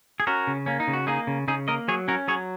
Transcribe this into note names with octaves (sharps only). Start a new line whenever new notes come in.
G#4
C#4 F#4 A#4
C#3
A#3 C#4
D#4
C#3
F#4
A#3 D#4 G#4
C#3
C#3 D#4 G#4
A#3 A#4 D#5
F#3 G#4 C#5
C#4 F#4 A#4
F#3 G#4 C#5